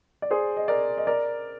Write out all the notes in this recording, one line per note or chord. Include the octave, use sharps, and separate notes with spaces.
D5
G#4 C5
D#5
A#4 D5
D#5
A#4 D5